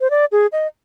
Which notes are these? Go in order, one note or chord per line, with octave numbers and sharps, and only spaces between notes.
C5
D5
G#4
D#5